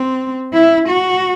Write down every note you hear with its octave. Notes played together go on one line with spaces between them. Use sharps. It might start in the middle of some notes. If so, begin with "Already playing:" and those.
Already playing: C4
E4
F#4